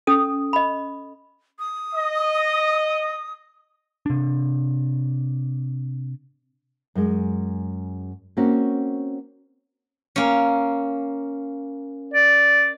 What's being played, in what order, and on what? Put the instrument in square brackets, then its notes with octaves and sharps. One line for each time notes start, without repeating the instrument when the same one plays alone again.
[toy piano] C#4 A4 D#6
D#5 B5
[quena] D#6
[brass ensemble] D#5
[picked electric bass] C3 D4
[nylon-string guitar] F#2 G#3
A#3 C4 C#4 F#4
[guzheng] A#3 C#4
[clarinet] D5